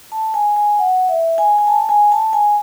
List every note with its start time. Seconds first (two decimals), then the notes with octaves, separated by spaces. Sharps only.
0.12 A5
0.34 G#5
0.57 G#5
0.79 F#5
1.09 E5
1.38 G#5
1.58 G#5
1.67 A5
1.89 G#5
2.12 A5
2.33 G#5